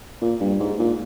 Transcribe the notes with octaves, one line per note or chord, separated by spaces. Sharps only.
A#2
G2
G#2
A#2